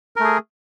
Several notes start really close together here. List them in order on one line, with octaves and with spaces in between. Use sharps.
A#4 A3 G#4